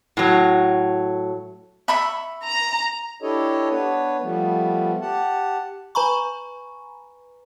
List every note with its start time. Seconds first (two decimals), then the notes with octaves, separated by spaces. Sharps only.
0.17 A2 F#3
1.88 E5 B5 C#6
2.43 A#5
3.22 D4 E4 G4 A4 C#5 D#5
3.70 B3 D4 B4 C#5
4.22 F3 G3 A3 B3
5.01 G4 F#5 A5
5.95 B4 G#5 A#5 B5 C#6